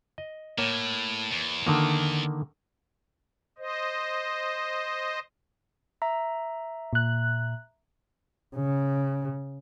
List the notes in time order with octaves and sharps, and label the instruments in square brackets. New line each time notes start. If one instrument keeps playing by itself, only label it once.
[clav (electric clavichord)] D#5
[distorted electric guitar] A2 [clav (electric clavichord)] A#3 C#5 A#5
[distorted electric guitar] E2
[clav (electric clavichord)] D3 D#3 A#3
[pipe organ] C5 D#5
[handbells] E5 A#5
[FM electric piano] A#2 F#6
[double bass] C#3